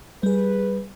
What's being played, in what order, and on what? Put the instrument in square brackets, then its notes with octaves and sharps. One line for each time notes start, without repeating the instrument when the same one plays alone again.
[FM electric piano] G3 G#4 [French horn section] B4